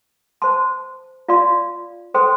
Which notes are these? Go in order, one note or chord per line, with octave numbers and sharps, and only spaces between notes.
C5 A5 C6
F4 D5 F5 C6
A4 C5 G5 C6